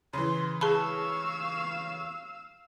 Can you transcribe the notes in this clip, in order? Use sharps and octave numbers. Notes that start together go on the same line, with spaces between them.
C#3 E3 C6
G#4 F5 A5 B5 C#6 E6